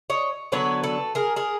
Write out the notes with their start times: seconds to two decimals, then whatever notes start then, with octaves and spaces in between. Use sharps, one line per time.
0.10 C#5 D#5
0.52 D3 F#3 B3 D4 B4 C#5
0.84 A4 B4
1.15 G#4 A#4
1.36 G#4 A#4